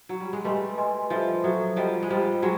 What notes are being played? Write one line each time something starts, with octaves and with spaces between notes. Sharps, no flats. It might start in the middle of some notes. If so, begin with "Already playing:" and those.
F#3
G3
G#3
G3 A3 B4 D#5 G#5 C6
B4 D#5 G#5 C6
F3 G3 A4 C5 E5
F#3 A4 C5 E5
F3 G3 C5 D#5 G5
G#3
F3 G3 C5 D#5 G5
F#3 G#3